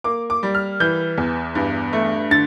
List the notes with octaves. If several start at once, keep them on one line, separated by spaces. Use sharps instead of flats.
A#3 D6
D6
G3
F6
E3 G6
E2
G2
A3
D3 A6